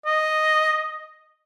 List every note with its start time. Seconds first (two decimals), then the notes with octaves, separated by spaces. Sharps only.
0.06 D#5